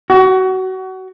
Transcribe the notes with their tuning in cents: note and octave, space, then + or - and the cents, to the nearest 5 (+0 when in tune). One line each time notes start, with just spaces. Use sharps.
F#4 +25